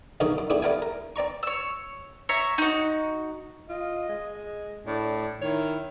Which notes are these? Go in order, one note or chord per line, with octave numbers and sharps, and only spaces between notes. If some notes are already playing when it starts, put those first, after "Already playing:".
B1 G2 D#3 C#4 G#4 D#6
F#2
A3 B3 D4 E4 G4 G#4
G3 A3 B3 F5 G5 G#5
A#4
C4 D5 A#5 C#6
C#5 E6
C#5 E5 A#5
D#4 F#4
F4 D#5
G#3
A2 D4 D5
D#3 E4 C#5